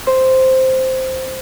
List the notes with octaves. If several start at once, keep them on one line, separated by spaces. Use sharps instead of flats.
C5